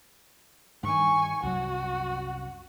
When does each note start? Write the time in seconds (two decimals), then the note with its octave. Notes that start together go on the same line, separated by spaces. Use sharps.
0.83 G2 D#3 G#5 C#6
1.43 C2 F#2 F#3 F#4